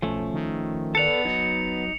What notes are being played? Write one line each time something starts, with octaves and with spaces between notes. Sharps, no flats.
B1 F3 A3 C#4
D#3
B3 A4 B4 D5 A5 C#7 F7
F#3 D#4